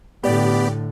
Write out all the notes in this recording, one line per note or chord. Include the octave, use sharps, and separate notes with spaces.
A2 D3 B3 G4 D5